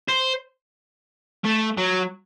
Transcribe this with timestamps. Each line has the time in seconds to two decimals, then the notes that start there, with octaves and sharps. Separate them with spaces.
0.08 C5
1.44 A3
1.78 F#3